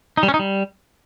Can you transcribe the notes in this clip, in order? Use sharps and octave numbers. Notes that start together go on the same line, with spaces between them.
D#4
G3
C#4
D#4
G3